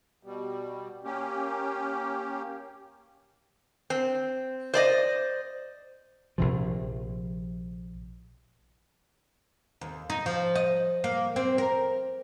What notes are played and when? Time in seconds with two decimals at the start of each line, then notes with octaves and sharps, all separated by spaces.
0.23 B2 G3
1.04 A#3 C#4 G4
3.90 C4
4.74 C5 D5 D#5
6.38 A#1 C3 F3
9.81 D#2
10.10 D#4
10.26 F3
10.55 D#5
11.04 A#3
11.36 C4
11.58 A#4